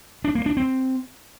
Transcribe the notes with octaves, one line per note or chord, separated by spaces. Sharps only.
D4
A#3
D4
C4